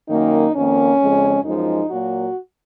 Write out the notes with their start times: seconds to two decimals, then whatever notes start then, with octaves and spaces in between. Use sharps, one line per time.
0.09 F#2 D#3 A#3 D#4
0.55 F2 D#3 A#3 C#4
1.00 F2 C#3 G#3
1.45 F#2 F3 G#3 D#4
1.90 A#2 F#3 A#3 F#4